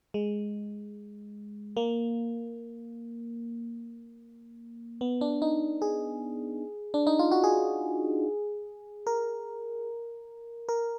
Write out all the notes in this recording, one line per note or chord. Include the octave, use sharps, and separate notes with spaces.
G#3
A#3
B3
D4
D#4
G#4
D4
D#4
F4
F#4
G#4
A#4
A#4